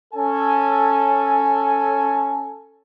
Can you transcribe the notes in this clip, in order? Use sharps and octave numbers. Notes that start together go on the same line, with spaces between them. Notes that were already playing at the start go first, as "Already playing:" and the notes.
C#4 A4 G#5